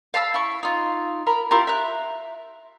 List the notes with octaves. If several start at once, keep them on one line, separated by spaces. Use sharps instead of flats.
F5 A5 B5 E6
E4 C#6
D#4 F4
A#4 A#5 B5
E4 F4 G4 A#4
E5 A#5 F#6